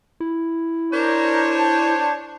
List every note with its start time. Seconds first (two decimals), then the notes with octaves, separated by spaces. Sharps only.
0.20 E4
0.92 D4 A#4 C5 C#5
1.58 A5